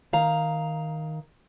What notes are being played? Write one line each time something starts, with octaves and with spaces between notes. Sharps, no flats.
D#3 F5 A#5